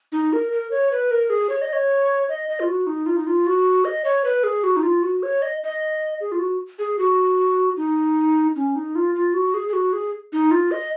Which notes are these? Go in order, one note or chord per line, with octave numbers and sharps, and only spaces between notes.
D#4
A#4
A#4
C#5
B4
A#4
G#4
C#5
D#5
C#5
D#5
D#5
F4
F#4
D#4
F4
D#4
F4
F#4
D#5
C#5
B4
G#4
F#4
D#4
F4
F#4
C#5
D#5
D#5
G#4
F4
F#4
G#4
F#4
D#4
C#4
D#4
F4
F4
F#4
G#4
G#4
F#4
G#4
D#4
F4
D#5